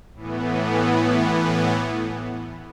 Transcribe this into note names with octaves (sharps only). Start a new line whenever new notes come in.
A2 E3 B3